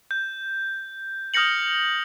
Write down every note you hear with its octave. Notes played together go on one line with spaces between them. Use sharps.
G6
D#6 F6 G6 A#6 C#7 F#7